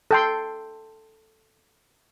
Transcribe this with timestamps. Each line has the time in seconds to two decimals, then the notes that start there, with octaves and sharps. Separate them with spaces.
0.11 A4 G5 C6